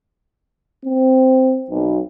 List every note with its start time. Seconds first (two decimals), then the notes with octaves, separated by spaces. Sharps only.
0.86 C4
1.71 B1